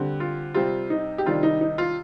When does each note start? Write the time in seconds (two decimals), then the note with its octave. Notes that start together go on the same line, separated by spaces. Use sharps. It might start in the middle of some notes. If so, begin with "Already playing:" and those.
Already playing: D3 G3 C4
0.20 F4
0.54 C3 G3 C4 F4
0.90 D#4
1.18 G4
1.26 C3 D#3 G3 D4 F4
1.43 D#4
1.61 D#4
1.78 F4